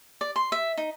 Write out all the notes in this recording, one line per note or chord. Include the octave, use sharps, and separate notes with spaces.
D5
C6
E5
D#4